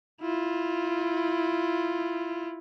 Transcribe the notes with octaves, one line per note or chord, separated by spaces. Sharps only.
E4 F4